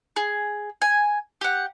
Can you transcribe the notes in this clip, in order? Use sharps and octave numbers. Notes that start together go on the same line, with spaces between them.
G#4
G#5
G4 F#5